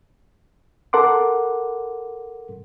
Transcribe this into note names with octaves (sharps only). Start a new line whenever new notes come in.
A4 A#4 F#5 C6 D6